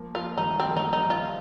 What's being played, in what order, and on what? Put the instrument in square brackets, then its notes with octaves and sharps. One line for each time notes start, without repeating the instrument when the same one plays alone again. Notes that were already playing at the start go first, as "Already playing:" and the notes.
Already playing: [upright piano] F3 A#3
[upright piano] F3 A#3 [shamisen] F4
[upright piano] D#3 G3 [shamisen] D#4
[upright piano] D#3
[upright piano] F3 [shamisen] C4
[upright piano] A#3
[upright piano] D#3 G3 [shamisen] D#4
[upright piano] F3 A#3 [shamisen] D#4
[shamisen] F4